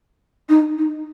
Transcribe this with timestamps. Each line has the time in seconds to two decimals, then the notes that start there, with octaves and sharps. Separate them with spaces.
0.49 D#4
0.78 D#4